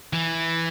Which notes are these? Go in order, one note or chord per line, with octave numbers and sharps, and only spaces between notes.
E3